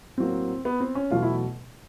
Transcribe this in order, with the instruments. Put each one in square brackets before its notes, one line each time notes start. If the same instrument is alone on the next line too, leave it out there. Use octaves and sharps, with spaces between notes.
[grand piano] A2 F#3 A#3 C4
B3
C4
C#4
E2 B2 F#3 A3 F4
E4